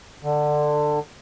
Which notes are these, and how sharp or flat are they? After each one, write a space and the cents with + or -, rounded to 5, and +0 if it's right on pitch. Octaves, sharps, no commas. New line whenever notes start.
D3 +20